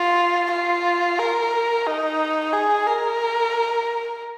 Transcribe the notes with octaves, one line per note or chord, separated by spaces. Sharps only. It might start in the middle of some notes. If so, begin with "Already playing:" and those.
Already playing: F4
F4
A#4
D#4
G#4
A#4